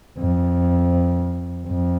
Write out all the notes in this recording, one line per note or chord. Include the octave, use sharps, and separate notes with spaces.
F2
F2